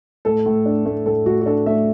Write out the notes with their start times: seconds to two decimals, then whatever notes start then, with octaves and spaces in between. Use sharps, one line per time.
0.25 A2 A4
0.46 A2
0.66 D4
0.85 A3
1.06 A2 A4
1.26 A2 F#4
1.41 F#4
1.46 D4 A4
1.66 A3 E5